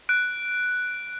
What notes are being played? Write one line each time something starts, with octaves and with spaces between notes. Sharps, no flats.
F#6 D7